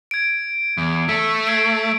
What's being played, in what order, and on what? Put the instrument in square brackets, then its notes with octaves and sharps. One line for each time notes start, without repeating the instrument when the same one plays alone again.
[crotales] G#6 D7
[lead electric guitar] E2
[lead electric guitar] A3 [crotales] B6
[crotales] G#6 C7 D7